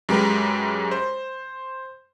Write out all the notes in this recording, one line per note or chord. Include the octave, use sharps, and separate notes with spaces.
F#2 G#3 G4 A#4 B4
C5